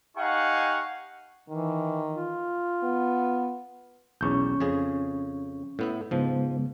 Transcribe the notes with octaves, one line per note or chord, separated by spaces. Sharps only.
D#4 G4 F5 F#5 G#5 C#6
D#3 E3
F4
B3
B1 E2 C#4 C#6 G6
F2 C#3 G#4
A2 B3 E5
G#2 C#3 F3 G#3 B3